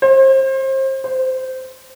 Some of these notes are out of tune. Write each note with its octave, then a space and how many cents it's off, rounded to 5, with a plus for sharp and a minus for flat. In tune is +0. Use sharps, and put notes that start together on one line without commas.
C5 +30
C5 -15